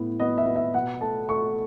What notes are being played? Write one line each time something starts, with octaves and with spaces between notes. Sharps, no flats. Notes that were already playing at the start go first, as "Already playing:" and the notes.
Already playing: A2 B3
B3 D#5
E5
B3
E5
B2 F#5
A3 A5
A3 C#6